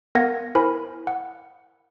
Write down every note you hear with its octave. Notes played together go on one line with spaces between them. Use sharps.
B3 A#4 F5 F#5 G#6 A#6
E4 A#4 C5 G#5 B5
F#5